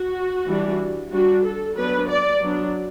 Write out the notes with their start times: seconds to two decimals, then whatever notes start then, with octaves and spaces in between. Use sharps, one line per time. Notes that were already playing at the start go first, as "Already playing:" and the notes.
Already playing: F#4
0.47 E3 G3 D4
1.11 G3 D4 F#4
1.44 A4
1.77 F#3 B3 D4 B4
2.09 D5
2.42 F#3 B3 D4